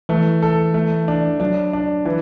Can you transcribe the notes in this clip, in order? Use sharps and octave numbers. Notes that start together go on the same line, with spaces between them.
E3 A3
A4
A3
D4
F#3 D4
D4
E3